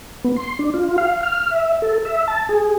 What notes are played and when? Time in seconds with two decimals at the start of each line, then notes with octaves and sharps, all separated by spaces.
0.24 B3
0.36 C6
0.59 D4
0.74 F4
0.98 F5
1.23 F6
1.50 E5
1.82 A4
2.05 E5
2.28 A5
2.49 G#4